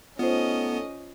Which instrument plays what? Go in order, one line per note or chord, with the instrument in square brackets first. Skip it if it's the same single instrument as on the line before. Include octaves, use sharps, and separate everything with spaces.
[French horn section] A3 D#4 A4 [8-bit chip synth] B3 [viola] C#4 D#5 [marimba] F4 C5